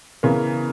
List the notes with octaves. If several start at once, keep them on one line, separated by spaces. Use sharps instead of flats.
C#3 E3 B3 A#4